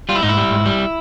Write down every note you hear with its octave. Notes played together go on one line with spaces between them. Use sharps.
G3 F4
E4
G#2 D#4
E4
G3
G#2
G3